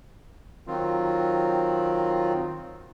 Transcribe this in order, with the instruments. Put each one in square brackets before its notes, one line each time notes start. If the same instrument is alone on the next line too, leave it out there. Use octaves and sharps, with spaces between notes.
[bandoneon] D#3 F#3 C4 F4